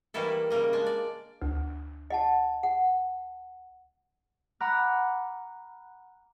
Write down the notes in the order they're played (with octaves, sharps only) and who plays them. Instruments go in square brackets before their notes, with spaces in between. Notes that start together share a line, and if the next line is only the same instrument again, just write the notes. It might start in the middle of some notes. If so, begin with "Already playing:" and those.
[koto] D#3 E3 G3 A#3 E4 A4
C#3 G3 A#3 D#5
G#3 D4
D5
[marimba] D2
[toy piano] D#5 F#5 A5
F#5
[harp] F#5 A#5 B5 D6 F6 F#6